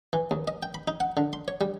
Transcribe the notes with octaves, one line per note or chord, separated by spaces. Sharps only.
E3
D#2
D#5
G5
B5
D#4
F#5
D3
C6
C#5
G3